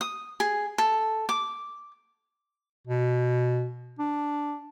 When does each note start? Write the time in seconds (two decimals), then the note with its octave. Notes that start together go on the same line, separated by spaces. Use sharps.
0.01 D#6
0.40 G#4
0.78 A4
1.29 D6
2.87 B2
3.99 D4